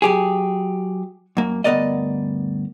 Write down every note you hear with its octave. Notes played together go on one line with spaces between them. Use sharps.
F#3 G4 G#4
F#2 A#3
D2 G2 B3 A#4 D5 D#5